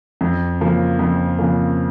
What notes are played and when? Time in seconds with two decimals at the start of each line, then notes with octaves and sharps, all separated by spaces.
0.21 F2
0.61 C#3 F3 A#3
0.99 F2
1.39 C#3 F3 A#3